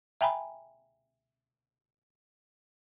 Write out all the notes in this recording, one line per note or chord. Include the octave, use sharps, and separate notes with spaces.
E5 G5 G#5 A#5 B5